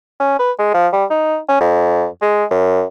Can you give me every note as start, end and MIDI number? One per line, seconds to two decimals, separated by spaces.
0.20 0.37 61
0.39 0.51 71
0.59 0.72 56
0.74 0.88 53
0.93 1.05 55
1.10 1.38 63
1.48 1.60 61
1.60 2.07 41
2.22 2.45 56
2.51 2.84 42